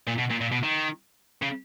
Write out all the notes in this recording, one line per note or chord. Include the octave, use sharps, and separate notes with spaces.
A#2
B2
A#2
A#2
B2
D#3
C#3